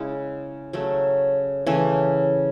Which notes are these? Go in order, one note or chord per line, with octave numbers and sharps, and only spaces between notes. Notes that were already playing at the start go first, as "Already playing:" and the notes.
Already playing: C#3 G#3 C#4 E4
C#3 F#3 A3
C#3 E3 A3